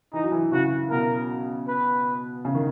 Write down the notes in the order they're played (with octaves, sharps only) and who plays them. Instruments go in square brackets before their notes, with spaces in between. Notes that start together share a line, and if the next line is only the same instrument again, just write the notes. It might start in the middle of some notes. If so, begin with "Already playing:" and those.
[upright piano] E3 [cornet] D#4
[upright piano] F#3
E3
[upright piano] C#3 [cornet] F#4
[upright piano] B2 [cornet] A#4
[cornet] B4
[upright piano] C#3
D#3